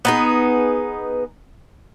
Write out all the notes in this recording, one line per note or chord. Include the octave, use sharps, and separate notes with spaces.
B3 D#4 G#4